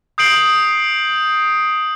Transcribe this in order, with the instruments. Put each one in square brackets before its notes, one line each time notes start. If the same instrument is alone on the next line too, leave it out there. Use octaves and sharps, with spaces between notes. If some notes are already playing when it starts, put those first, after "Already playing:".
[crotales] D#6 G6 C7 D7 F#7